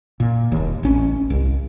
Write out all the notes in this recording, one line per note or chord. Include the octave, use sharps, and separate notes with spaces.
A#2
D#1 D#2
A1 C#4
C2